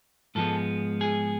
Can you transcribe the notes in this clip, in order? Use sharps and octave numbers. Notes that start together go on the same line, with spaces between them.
G#2 F3 G#3 B3 A4
G#4